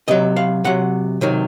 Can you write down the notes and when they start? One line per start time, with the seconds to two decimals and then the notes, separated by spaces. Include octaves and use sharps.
0.08 C3 F#3 D#5
0.36 F5
0.64 C3 F#3 F#5
1.21 C3 D#3 F#3